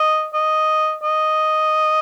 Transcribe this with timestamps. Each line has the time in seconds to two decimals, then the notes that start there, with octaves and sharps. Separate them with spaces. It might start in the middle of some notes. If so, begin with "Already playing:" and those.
Already playing: D#5
0.34 D#5
1.03 D#5